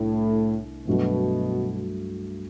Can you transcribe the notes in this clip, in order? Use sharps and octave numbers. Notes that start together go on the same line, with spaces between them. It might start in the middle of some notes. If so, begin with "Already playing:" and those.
Already playing: C2 A2 A3 D4
G2 B2 F#3 A3 D4 F#4